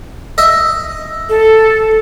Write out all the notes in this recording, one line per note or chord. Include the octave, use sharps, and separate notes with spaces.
D#5 E5
A4